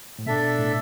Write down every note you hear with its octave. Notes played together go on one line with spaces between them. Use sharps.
A2
B2 D4 A4 E5
A2